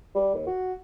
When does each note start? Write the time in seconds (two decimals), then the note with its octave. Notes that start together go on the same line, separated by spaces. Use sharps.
0.15 G3
0.34 D#2
0.46 F#4